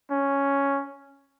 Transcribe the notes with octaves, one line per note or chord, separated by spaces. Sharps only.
C#4